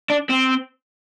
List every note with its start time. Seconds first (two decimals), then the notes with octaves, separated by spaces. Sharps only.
0.10 D4
0.30 C4